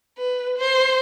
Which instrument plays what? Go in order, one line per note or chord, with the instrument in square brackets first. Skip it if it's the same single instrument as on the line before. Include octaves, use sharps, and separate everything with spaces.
[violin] B4
C5